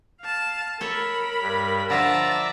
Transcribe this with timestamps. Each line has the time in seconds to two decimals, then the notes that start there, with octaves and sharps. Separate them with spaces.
0.21 F5 A5
0.81 A4 A#4 C#5 B5
1.41 G2
1.90 D3 F3 D4 D5 E5 A5 A#5